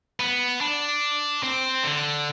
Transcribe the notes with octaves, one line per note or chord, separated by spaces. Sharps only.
B3
D4
C4
D3